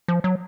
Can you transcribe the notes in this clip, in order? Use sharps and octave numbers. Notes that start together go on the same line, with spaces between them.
F3
F#3